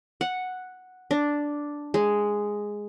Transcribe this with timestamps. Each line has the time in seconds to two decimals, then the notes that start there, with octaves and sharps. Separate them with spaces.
0.21 F#5
1.11 D4
1.94 G#3